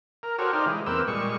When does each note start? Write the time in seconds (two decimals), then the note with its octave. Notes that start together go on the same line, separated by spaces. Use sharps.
0.23 A#4
0.39 F#4 G4 A4 A#4 C5 C#5
0.53 D#4 G4 C5 D5 F5
0.66 E3 G#3
0.86 E2 A#3 C4 G4 B4 E6
1.08 A#2 G3 G#3 C#6